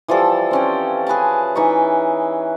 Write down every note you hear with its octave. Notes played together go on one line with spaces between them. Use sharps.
E3 F3 G3 A4
C4 C#4 G5
G#4 B4 G#5 A5
E3 D#4 E5 C#6